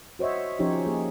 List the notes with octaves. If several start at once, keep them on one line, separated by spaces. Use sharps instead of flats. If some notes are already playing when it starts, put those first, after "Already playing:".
F#4 C5 C#5 D#5 E5
F3 C#4 D#4 G4 C5 C#5
A#3 G#4